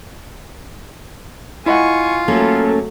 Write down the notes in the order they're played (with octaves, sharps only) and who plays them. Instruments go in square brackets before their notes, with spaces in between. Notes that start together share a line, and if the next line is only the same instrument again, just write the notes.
[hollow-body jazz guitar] E4 D#5 F#5 [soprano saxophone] F4 [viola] G#5 C#6
[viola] F#3 A3 [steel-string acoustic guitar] A#3 C#4 A4